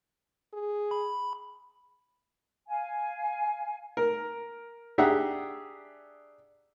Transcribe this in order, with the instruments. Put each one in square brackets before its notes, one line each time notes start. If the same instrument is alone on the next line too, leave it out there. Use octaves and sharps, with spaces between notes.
[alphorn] G#4
[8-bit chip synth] B5
[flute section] F5 G#5
[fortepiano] A#4
D4 G4 G#4 E5 F#5 A#5